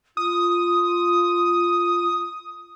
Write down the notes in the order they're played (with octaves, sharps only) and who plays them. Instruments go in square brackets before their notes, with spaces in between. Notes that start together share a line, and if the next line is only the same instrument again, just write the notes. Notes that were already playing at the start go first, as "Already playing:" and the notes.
[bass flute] F4 [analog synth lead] D#6